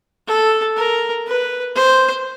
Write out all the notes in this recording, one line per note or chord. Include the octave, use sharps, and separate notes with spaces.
A4
A#4
B4
C5